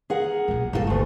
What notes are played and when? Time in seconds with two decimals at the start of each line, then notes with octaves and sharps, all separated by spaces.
0.10 G#4 A#4 F#5
0.48 B1 A#2
0.73 G1 A#3 F#4 A4
0.87 D2 A3